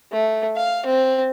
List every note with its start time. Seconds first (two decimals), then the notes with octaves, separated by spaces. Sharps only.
0.12 A3
0.56 F5
0.86 C4